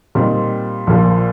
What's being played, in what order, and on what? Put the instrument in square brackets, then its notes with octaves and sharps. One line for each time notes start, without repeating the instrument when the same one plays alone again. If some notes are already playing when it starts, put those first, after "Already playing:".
[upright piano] A#2 G3 C4 D#4
A#1 A#2 F3